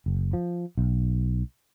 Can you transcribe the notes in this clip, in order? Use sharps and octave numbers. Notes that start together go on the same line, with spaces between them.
F#1
F3
B1